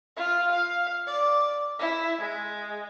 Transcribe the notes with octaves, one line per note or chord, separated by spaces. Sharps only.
F4
F5
D5
E4
G#3